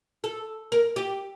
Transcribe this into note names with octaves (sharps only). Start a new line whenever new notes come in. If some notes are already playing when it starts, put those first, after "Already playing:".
A4
A#4
G4